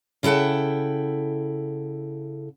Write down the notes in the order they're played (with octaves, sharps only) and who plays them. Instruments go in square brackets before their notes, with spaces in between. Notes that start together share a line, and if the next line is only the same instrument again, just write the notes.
[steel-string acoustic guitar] C#3 E4 A4 F#5 G5